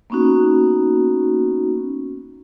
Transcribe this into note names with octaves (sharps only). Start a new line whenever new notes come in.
A#3 B3 C#4 D#4 F#4